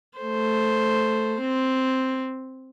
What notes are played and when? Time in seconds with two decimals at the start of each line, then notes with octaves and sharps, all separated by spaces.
0.18 A3 C5
1.41 C4